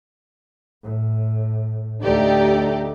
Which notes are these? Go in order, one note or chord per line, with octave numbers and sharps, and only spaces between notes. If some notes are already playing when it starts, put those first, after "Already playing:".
A2
D2 A3 D#4 G4 D5